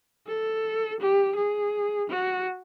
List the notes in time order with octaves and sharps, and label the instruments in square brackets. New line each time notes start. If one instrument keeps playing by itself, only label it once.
[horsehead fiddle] A4
G4
G#4
F#4